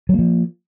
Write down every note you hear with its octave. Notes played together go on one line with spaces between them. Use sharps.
F3 F#3 A#3